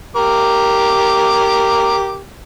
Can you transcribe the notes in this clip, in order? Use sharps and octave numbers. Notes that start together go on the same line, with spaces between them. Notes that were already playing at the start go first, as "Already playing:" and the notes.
G4 A#4 D6